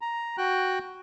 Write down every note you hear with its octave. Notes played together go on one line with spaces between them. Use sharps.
A#5
F#4 G5 F#6